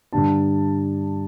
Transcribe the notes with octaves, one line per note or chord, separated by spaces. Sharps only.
G2 D3 G3 D4 A5